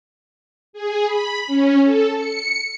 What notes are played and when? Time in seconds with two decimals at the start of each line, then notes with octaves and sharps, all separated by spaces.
0.73 G#4
1.05 B5
1.47 C#4
1.83 A4
2.14 C#7